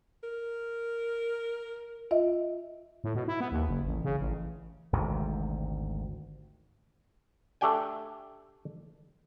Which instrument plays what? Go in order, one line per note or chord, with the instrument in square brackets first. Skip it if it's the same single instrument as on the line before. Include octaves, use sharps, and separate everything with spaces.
[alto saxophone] A#4
[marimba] F4 D#5 E5
[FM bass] A2
B2
E4
B3
D#2
F#1
A1
C#3
A1
[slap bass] G#1 D2 G#2 C3
[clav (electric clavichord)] A3 D4 G4 G5 G#5